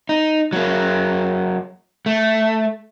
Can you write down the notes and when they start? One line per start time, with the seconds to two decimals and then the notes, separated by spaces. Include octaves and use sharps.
0.09 D#4
0.53 F#3 A#3
2.06 A3